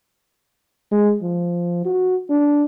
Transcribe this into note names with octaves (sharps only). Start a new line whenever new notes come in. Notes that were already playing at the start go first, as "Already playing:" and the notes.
G#3
F3
F#4
D4